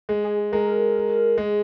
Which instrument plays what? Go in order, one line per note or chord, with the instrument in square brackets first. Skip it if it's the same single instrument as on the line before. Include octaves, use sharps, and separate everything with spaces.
[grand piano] G#3
[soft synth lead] G#4
[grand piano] G#3 [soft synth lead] A#4
[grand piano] G#3 [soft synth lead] G#4